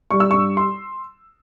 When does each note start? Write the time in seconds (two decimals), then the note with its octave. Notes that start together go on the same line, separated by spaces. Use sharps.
0.11 G3 C#6
0.20 E6
0.31 G2 C#6
0.57 C6